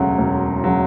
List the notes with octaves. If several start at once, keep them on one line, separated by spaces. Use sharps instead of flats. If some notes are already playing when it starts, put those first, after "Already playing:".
Already playing: E1 D2 C#3 F#3
E1
C#3 F#3